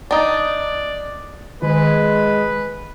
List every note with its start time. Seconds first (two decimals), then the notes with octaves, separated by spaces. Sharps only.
0.11 D4 D#4 D5
1.62 D#3 G#3 B4